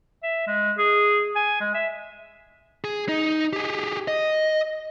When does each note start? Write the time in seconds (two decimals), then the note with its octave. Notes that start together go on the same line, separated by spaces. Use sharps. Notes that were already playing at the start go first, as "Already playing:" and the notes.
0.23 E5
0.47 G#3
0.78 G#4
1.36 G#5
1.61 G#3
1.74 E5
2.84 G#4
3.09 D#4
3.53 G4 G#4
4.08 D#5